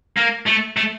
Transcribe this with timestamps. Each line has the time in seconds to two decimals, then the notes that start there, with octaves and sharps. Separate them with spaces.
0.17 A#3
0.46 A3
0.77 A3